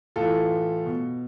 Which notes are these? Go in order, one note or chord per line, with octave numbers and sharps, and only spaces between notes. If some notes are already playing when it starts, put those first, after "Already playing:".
A2 E3 F4 A4
B2